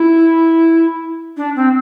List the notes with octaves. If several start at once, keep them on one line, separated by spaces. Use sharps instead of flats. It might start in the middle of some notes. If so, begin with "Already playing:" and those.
Already playing: E4
D4
C4